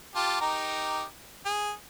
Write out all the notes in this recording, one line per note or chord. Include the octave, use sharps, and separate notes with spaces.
F4 G4 A5
D#4 G4 A#4
G#4